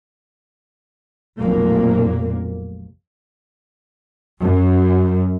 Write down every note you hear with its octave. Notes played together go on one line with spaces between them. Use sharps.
F1 B1 F2 A#2 A#3
F#2